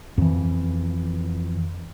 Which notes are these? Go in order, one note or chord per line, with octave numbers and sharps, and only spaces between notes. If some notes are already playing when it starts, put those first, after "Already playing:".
F2 E3